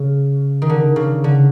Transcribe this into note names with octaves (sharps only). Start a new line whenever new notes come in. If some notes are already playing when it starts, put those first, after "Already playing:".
Already playing: C#3
D#3
D3
C#3
D3